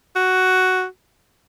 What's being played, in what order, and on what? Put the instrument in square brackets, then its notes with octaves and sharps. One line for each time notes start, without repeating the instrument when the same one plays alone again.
[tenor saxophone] F#4